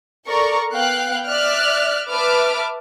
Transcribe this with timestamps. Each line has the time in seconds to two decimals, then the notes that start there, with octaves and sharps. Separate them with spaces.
0.27 A4 A#4 D5 A#5 C#6
0.73 B3 F5 G5 F#6
1.28 D5 E5 F6 F#6
2.11 B4 E5 A5 D6 F6